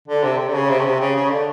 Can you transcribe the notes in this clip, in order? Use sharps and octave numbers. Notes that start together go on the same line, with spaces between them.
D3
C3
C3
D3
C#3
C3
C#3
C3
C#3
C#3
D3